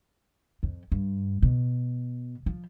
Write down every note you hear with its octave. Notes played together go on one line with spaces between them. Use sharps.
F2
G2
B2
F3